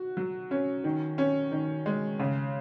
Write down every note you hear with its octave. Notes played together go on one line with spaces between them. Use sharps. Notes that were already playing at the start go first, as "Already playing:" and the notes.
Already playing: F#4
F#3
C#4
D#3
C#4
D#3
G#3
C#3